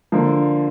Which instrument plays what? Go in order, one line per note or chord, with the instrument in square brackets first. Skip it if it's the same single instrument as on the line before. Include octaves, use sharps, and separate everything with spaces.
[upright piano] D3 F3 A#3